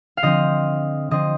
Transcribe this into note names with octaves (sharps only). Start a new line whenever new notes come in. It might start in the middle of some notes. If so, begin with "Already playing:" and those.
F5
D3 F3 C4 D#5
D3 F3 C4 D#5